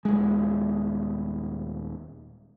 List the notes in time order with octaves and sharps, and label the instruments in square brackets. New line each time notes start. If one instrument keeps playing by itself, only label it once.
[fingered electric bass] D#1 G#3